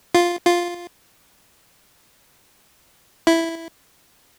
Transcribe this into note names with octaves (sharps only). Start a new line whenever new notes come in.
F4
F4
E4